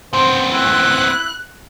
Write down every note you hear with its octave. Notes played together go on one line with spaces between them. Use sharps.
B3 C4 C5
E4 F#6